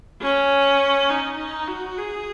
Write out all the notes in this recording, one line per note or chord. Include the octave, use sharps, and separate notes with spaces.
C#4
D#4
D#4
F#4
G#4